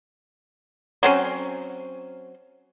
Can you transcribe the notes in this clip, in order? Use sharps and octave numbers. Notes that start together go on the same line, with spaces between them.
F#3 C4 C#4